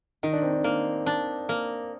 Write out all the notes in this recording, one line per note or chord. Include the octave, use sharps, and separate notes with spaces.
D#3 D#4
D4
C4
D4
A#3
D4
A#3